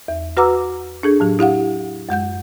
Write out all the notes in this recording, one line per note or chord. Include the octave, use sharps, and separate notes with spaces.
E2
F#4 B4 F#5 A#5 D6 E6
D4 G#4 A4
A2 F#3 G4
E4 G4 F5 F#5
F#2 G#3 F#5 G6